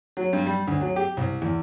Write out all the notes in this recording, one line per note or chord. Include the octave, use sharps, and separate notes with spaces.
F#3
G2
G3
D2
F#3
G4
C2
E2